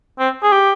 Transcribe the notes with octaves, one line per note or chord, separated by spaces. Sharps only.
C4
G#4
G4